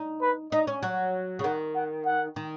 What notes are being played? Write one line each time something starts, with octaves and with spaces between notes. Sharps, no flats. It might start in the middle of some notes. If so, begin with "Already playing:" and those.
Already playing: D#4
B4
D#4 D#5
C#4
F#3
C#3
D#3 F#5
F#5
F#5
D#3